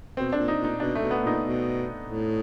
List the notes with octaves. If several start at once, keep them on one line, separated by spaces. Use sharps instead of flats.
B2 C4
A#2 D4
D#4
A#2
D#4
B2 D4
A3
B2
B3
A#2 D#4
B2
A2